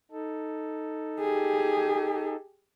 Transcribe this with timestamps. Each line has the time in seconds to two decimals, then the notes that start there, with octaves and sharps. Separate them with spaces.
0.11 D#4 A4
1.20 G4 G#4